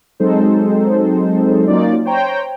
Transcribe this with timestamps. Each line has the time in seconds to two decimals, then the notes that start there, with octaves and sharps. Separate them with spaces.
0.20 F#3 G#3 C4 D#4 A4 C5
1.67 F#3 A#3 C#4 D#4 F4 D5
2.05 C5 C#5 G5 A#5